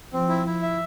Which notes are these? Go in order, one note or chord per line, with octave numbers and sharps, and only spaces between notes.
F3 C4
E4
E4
E5